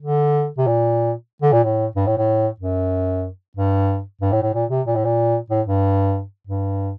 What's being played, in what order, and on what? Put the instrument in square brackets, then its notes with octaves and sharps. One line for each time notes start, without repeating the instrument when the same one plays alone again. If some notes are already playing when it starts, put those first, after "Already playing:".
[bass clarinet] D3
C3
A#2
D3
A#2
A2
G2
A2
A2
F#2
G2
G2
A2
A2
A#2
C3
A#2
A2
A#2
A2
G2
G2